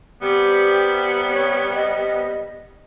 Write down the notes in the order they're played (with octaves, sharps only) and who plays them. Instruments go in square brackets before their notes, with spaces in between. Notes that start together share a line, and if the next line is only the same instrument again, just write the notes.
[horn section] C3 G3 B3 [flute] G4
[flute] C#5
D#5